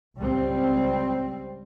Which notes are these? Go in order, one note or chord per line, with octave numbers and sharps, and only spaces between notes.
C#2 G3 C4